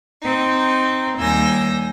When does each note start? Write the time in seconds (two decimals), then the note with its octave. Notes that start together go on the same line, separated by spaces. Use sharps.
0.22 C4 D#4
1.19 D#2 G3 G#5 E6 G6 A#6